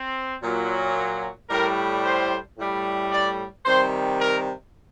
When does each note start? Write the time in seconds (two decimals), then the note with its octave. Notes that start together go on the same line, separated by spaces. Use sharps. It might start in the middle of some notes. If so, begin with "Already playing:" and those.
Already playing: C4
0.42 A#2 F#3
1.50 A2 G3 A#4
2.04 C5
2.57 A2 G3
3.12 D5
3.65 C3 D#3 G3 C5
4.19 A#4